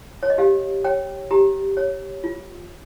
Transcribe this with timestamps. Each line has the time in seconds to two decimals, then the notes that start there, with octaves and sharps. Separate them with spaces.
0.23 C#5
0.30 D#5
0.38 G4 F5
0.84 C#5 G5
1.31 G4 A#5
1.77 C#5
2.24 F4